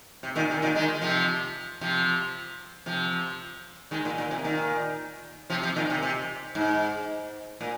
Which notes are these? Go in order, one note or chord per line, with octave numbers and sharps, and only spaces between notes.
C3
A#2 D#3
C3
A#2 D#3
D#3 G#3
C3 F3
C3 F3
C3 F3
D#3 G#3
A#2 D#3
A#2
C3
A#2 D#3
C3 F3
C3 F3
A#2 D#3
C3
C3
G#2
A#2